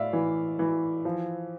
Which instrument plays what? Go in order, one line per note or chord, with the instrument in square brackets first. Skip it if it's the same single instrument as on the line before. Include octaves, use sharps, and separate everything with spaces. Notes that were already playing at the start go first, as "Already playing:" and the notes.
Already playing: [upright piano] A2 D5 E5 F5
E3
E3
F3